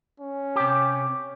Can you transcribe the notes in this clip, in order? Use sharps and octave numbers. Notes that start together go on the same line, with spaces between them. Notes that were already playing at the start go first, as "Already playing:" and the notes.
C#4
C3 G4